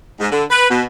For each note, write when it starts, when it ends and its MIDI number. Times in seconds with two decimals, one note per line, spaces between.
0.20 0.29 44
0.31 0.44 50
0.50 0.66 71
0.69 0.82 47